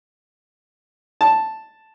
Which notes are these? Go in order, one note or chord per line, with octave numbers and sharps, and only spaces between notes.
A5